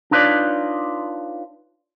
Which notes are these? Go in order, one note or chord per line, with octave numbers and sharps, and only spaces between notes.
D4 D#4 F4 B4 C#5 D5